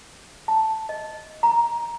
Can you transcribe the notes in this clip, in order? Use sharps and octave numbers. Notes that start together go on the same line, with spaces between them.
A5
D#5
A#5